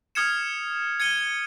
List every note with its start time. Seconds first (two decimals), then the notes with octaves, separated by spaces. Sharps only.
0.15 D#6 F6 G#6 C#7 E7
1.00 G#6 C#7 D#7 G7